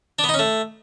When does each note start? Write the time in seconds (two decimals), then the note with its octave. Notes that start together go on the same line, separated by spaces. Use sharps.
0.19 D4
0.24 B3
0.29 D#4
0.34 C#4
0.39 A3